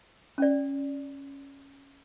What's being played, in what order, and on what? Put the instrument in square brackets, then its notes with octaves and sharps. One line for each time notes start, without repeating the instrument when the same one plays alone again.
[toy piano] C#4 D5